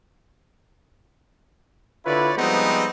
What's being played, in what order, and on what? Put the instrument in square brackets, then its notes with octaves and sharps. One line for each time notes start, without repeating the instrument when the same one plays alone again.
[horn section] D3 E4 F4 B4 C#5 D5
F3 G3 G#3 B3 C4 D#4